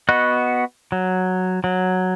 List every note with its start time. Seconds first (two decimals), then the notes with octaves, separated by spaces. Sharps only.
0.09 B3 F#4 D#5 F#6
0.92 F#3
1.64 F#3